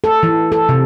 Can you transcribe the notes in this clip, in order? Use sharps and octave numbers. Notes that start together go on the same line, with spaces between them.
A4
E3
A4
C3